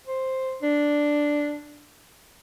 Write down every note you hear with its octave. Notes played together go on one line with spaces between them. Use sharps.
C5
D4